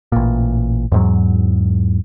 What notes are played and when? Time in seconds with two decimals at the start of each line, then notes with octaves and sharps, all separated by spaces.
0.12 A1 A#2
0.92 E2 G#2 F#3